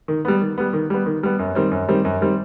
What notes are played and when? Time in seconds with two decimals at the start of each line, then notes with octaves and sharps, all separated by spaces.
0.08 D#3
0.25 G3 B3
0.41 D#3
0.58 G3 B3
0.73 D#3
0.90 G3 B3
1.06 D#3
1.23 G3 B3
1.39 F#2
1.55 D#3 G3 C4
1.71 F#2
1.88 D#3 G3 C4
2.05 F#2
2.21 D#3 G3 C4